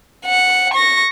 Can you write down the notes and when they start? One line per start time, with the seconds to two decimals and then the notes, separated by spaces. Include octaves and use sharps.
0.25 F#5
0.74 C#6 A#6